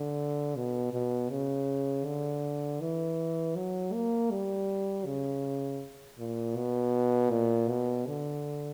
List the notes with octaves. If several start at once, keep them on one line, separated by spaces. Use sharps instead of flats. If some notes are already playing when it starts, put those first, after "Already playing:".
Already playing: D3
B2
B2
C#3
D3
E3
F#3
A#3
G3
C#3
A#2
B2
A#2
B2
D3